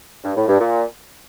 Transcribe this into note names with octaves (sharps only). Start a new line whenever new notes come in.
G2
A2
G2
A#2